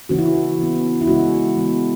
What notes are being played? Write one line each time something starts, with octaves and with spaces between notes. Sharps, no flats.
C#3 E3 A#3 C#4 F#4
E4
F#4
E3 B3
E4
C#3 G#3 C#4 F#4
E3 G#3 B3